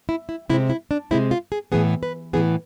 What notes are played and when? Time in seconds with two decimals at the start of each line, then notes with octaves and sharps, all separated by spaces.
0.09 E4
0.29 E4
0.49 C3 G#3 C4 E4
0.70 E4
0.91 D4
1.11 C3 G#3 C4 E4
1.31 F4
1.52 G#4
1.72 A2 E3 B3 G#4
2.03 B4
2.33 A2 E3 B3 G#4